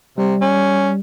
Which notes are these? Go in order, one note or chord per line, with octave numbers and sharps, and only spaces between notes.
C3 G3
C#4